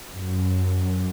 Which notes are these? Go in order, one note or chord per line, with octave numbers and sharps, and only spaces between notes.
F#2